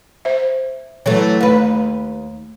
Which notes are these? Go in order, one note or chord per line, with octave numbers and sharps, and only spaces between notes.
C5 E5
E3 F#3 A3 C#5
D#2 A3 B4